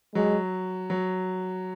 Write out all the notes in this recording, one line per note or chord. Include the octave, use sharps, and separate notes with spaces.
F#3 G#3
F#3